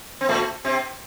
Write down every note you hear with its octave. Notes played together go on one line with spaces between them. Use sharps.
C4
A2 A3
C3 C4